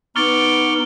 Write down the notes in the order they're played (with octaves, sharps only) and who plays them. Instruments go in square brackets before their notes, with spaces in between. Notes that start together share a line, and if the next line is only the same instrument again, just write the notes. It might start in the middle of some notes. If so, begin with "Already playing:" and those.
[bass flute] B3 [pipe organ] D#4 [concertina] C#6 D6 F6 [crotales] A6 D7 G7